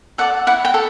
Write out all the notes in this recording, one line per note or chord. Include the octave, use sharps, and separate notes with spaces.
A4 D5 F#5
E4 F#5
G5
A4